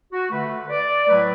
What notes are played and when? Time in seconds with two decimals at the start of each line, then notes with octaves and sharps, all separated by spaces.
0.12 F#4
0.31 D3 A3 B4
0.70 D5
1.07 A2 F#3 A3 B4